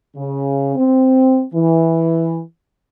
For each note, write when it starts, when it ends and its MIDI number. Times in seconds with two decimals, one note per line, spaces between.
0.16 0.73 49
0.76 1.43 60
1.54 2.39 52